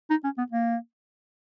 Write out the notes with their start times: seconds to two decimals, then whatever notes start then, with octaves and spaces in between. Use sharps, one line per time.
0.10 D#4
0.24 C#4
0.38 B3
0.52 A#3